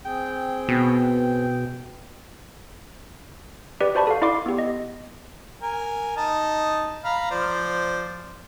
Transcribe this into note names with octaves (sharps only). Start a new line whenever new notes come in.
C4 G#4 G5
B2
G4 B4 D5 B6
F#4 C5 D5 A5 B5 C#6
A4 F5
E4 D5 F5 C6 D6 C7
B3 G4
D#5
A#4 G#5
D#4 D#5 A5
F5 A#5 B5
F3 C5 D5